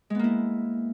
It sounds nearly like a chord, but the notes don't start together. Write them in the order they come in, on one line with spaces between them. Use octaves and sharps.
G#3 B3 A#3 E4